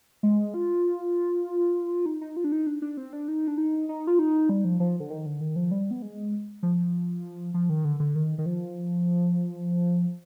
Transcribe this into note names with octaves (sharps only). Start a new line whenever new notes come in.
G#3
F4
D#4
D#4
F4
D4
D#4
D4
D4
C4
D4
D#4
D4
D#4
D#4
F4
D#4
G3
F3
F3
D3
D#3
D3
D#3
F3
G3
B3
G#3
F3
F3
D#3
D3
D3
D#3
D#3
F3